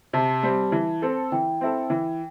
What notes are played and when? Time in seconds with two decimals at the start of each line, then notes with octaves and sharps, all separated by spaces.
0.13 C3 A5
0.43 G3 C4
0.72 E3
1.02 C4 A4
1.32 E3 G5
1.61 C4 E4 A4
1.90 E3